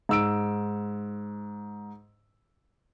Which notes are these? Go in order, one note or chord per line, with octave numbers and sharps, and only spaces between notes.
G#2 E6 D7